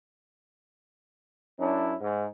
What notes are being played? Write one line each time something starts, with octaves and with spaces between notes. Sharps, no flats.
F#2 C#4 D4 E4
G#2